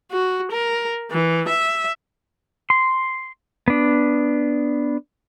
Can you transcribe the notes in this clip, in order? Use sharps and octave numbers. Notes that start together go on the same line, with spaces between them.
F#4
A#4
E3
E5
C6
B3 D4